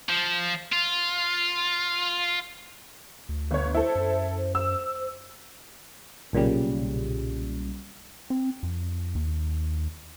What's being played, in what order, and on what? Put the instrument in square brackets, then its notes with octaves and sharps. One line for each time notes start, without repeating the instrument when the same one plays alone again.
[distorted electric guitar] F3
F4
[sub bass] D2
[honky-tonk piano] G1 C#5
[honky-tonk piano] E4 A4 [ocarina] C5
[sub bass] F#2
[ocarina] C5
[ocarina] C5 [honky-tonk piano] E6
[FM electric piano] B1 A#2 C#3 G3
[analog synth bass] C4
F2
D#2